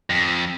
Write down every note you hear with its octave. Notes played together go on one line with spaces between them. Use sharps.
F2